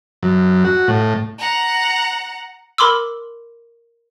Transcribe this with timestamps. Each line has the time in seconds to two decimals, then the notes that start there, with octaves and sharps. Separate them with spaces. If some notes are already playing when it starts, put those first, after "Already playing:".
0.23 F#2
0.65 F#4
0.88 A2
1.38 F#5 A#5
2.78 A#4 B5 C6 D6 E6